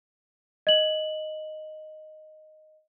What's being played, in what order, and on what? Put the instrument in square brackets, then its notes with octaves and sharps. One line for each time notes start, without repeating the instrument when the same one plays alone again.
[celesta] D#5 F#7